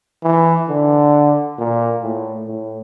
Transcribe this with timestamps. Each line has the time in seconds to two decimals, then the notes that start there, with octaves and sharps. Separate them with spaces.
0.23 E3
0.69 D3
1.59 A#2
2.02 A2
2.48 A2